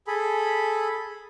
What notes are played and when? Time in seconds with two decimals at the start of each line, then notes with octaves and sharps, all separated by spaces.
0.07 G#4 A4 B5